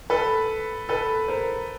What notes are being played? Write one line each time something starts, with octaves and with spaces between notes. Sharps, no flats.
A4 B4
A4 B4
A#4 C5